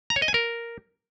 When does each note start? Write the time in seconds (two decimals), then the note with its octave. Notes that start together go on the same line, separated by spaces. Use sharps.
0.10 A#5
0.16 C#5
0.22 D#5
0.28 G#5
0.34 A#4